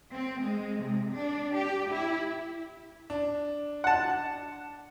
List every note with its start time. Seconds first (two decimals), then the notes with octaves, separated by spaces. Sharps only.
0.12 C4
0.41 G#3
0.81 C3
1.15 D4
1.55 G4
1.91 E4
3.10 D4
3.84 F#5 A5